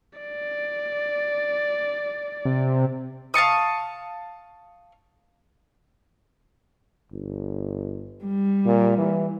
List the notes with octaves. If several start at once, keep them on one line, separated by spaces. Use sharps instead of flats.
D5
C3
F5 A5 C#6 D#6
G1
G3
A#2
E3